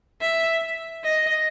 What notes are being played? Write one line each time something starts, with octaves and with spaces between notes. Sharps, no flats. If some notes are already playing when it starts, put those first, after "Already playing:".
E5
D#5